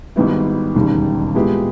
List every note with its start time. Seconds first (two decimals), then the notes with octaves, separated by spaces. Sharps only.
0.16 G#1 G#2 G3 B3 E4
0.75 E1 D#2 C#3 G3
1.35 A#2 G#3 B3 E4 G4